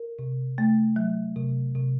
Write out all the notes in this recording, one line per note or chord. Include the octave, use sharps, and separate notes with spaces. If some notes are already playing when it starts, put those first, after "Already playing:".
Already playing: A#4
C3
A3
F#3
C3
C3